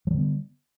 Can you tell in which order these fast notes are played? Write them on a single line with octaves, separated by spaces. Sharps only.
F#3 G3 D3 B3